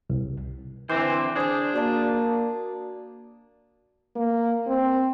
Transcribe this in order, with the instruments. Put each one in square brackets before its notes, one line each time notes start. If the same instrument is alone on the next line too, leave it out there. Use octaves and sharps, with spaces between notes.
[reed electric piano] C2
[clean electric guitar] D3 C4 C5 [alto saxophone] E3 [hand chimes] D6
[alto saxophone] D4 [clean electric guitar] G#4 [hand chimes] C5 G6
[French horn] A#3 [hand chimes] F#4 D5 A5
[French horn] A#3
C4